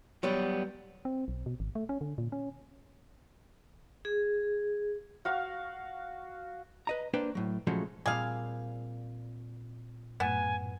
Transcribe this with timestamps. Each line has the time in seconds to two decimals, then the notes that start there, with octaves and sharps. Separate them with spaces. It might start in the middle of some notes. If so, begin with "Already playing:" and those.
0.23 F#3 G3 B3
1.05 C4
1.28 B1
1.46 B2
1.60 G#1
1.75 A3
1.89 C#4
2.01 D3
2.18 A#2
2.32 C#4
4.05 G#4
5.25 F#4 F5 C#6
6.87 B4 D#5 A#5
7.14 A#3 D4 B4 C5 G5
7.35 A2 F#3
7.67 A#2 C#3 F3 F#3 G#3 A3
8.06 A#2 G3 C4 G#4 F5
10.20 F#2 A2 B3 G#5 E7